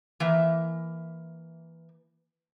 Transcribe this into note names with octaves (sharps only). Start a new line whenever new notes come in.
E3 A#3 E5